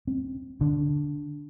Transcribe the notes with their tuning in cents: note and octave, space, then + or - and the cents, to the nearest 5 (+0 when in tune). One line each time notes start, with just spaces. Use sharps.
C4 +15
D3 -10